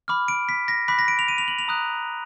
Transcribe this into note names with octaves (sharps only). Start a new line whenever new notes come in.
B5 D6 F6
D7
B6
A#6
B5 D6 F#6 B6
A#6
D7
F7
D#7
F7
F#7
F7
A#5 D#6 F#6